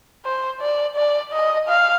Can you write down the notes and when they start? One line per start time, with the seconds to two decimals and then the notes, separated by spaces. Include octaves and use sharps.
0.25 C5
0.61 D5
0.96 D5
1.33 D#5
1.68 F5